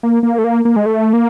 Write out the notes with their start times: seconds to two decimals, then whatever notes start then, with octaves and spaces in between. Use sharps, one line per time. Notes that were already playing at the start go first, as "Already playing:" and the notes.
0.03 A#3
0.23 A#3
0.38 A3
0.44 A#3
0.65 A#3
0.76 G#3
0.86 A3
1.13 A#3